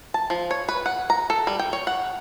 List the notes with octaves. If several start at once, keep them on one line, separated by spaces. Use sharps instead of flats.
A5
F3
C#5
B4
F#5
A#5
A4
G3
G5
C#5
F#5